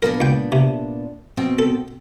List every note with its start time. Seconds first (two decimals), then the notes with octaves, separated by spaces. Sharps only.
0.02 A#2 B3 D4 A#4
0.20 C#2 G5
0.52 C3
1.37 B2 C4 G5
1.59 A4